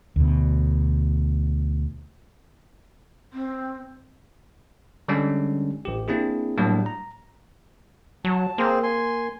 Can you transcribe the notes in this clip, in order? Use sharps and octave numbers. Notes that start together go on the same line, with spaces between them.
D2 B2
C4
D3 G3 G#3 C#4 D4
A1 G4
A#3 C4 D4 E4 G#4
A2 F#3 G3 A#3 D4
A#5
F#3 A5
A#3 C4 G#4 C5
G#5 C6